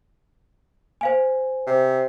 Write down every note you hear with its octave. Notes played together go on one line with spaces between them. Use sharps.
C5 F5 G#5
C3